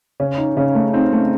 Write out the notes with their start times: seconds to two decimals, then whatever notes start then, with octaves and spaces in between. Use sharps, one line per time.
0.20 C#3 C#4
0.38 D#4
0.56 C#3 C#4
0.75 A3
0.93 C4 D#4
1.12 A3